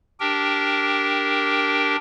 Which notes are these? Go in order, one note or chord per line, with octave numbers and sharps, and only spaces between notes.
D4 G4 A#4 G5